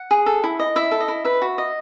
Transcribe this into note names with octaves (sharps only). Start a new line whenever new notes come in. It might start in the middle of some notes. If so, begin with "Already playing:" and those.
Already playing: F#5
G#4
A4
E4
D#5
E4 E5
A4
D#5
E4
B4 E5
F#4
D#5